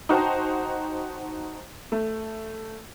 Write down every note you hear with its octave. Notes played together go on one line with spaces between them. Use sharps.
D#4 F#4 C5 G5 A5
A3